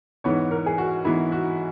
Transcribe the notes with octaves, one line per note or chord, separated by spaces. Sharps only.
G#2 E3 B3 C#5
A#4
G#4
F#4
G#2 E3 B3 E4
F#4